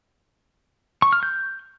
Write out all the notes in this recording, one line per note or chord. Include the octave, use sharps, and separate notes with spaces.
C#6
F6
G6